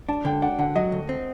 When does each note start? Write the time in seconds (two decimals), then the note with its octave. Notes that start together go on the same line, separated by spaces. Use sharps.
0.09 D4 A5
0.25 D3 G5
0.42 D4 F#5
0.59 D3 F#5
0.76 F#3 D#5
0.92 D2
1.09 C4